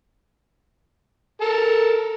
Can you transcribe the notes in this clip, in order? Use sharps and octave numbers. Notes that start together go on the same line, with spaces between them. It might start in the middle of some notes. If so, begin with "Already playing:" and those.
A4 A#4